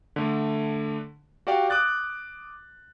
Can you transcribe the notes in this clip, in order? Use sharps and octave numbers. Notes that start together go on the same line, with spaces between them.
D3 A3
F#4 G4 D5 F5 G5
D6 D#6 F#6 A6